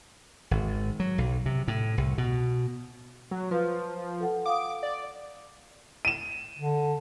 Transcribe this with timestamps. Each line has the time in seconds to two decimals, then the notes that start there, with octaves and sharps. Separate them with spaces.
0.51 G#1
1.00 F#3
1.18 B1
1.46 C3
1.68 A2
1.98 C2
2.18 B2
3.31 F#3
3.51 F3 B4 F5
4.20 A4 F#5
4.46 F5 G5 D6 D#6
4.83 D5
6.05 D#7 E7
6.58 D3